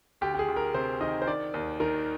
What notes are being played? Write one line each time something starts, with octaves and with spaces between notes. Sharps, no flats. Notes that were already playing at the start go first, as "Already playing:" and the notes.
D2 G4
G4
G#4
D2
A#4
C3 C5
D#3 D#5
C5
D#3 D5
D#2
D#3 A#4